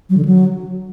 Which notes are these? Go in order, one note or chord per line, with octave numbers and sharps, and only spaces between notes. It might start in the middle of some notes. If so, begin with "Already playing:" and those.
F#3
D3
F#3